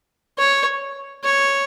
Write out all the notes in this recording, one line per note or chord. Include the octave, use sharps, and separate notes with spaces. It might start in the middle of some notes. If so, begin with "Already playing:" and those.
C#5
C#5